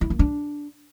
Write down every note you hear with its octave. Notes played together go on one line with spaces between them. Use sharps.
E4
A#3
D4